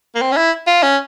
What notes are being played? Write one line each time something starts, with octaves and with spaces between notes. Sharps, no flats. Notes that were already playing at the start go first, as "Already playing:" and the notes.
A#3
C4
C#4
E4
F4
C#4